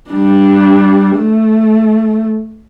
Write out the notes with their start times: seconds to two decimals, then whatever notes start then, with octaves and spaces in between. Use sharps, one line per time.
0.11 G3 D4
1.18 A3